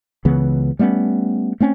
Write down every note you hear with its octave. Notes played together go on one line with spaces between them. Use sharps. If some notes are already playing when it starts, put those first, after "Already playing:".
C#2 C#3 E3 B3
G3 A3 B3 C#4
A3 C4 C#4